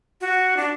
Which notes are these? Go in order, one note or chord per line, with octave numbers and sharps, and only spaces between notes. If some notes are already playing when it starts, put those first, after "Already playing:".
F#4
D4